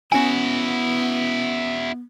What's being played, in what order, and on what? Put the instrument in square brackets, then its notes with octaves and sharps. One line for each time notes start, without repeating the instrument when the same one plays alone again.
[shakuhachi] B3 [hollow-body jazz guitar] C#4 G#5 [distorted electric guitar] E4 F#4